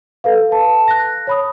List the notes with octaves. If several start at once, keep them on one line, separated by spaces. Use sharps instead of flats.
A4 B4 F5
A5
F#6 A#6
C#5 B5 D#6